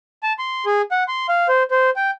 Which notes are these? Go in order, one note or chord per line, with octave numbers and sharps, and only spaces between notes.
A5
C6
G#4
F#5
C6
F5
C5
C5
G5